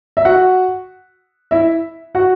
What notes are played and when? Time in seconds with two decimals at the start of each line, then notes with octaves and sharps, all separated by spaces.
0.17 E5
0.25 F#4 F#5
1.51 E4 E5
2.15 F#4 F#5